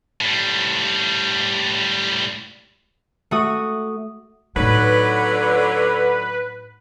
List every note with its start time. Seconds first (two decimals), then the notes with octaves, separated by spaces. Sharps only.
0.21 A2 G3
3.31 A3 F#4 D#6
4.56 A2 D3 F#3 D#4 B4